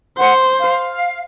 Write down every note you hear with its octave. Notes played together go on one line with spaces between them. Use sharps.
C5 F#5
F5